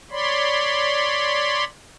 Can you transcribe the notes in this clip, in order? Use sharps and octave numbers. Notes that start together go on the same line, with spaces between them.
C#5 D5 B5 C6